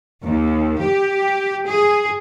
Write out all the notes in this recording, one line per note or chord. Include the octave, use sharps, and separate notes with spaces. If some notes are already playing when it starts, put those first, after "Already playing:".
D#2
G4
G#4